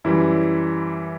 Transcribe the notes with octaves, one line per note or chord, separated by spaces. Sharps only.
F#2 E3 G3 E4